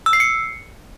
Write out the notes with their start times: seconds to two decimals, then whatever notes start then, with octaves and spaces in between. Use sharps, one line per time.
0.06 E6
0.13 C7
0.20 C#7